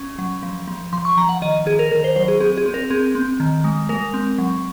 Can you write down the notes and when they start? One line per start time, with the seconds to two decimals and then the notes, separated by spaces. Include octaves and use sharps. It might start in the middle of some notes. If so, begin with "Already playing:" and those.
Already playing: C#4
0.19 F#3
0.43 F3
0.68 F3
0.93 F3 C6
1.05 C#6
1.17 F3 A#5
1.29 F#5
1.42 D#3 D#5
1.66 D#3 G#4
1.79 A#4
1.91 D#3 A#4
2.04 C5
2.16 F#3 C5
2.28 G#4
2.40 C4 G#4
2.58 G#4
2.66 C4
2.74 A#4
2.90 C4 G#4
3.15 C4
3.40 D#3
3.64 G#3
3.89 G#3 A#4
4.14 C4
4.38 F#3